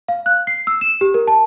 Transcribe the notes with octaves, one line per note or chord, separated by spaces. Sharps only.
F5
F#6
C7
E6
E7
G4
A#4
A5